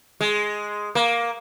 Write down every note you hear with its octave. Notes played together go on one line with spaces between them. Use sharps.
G#3
A#3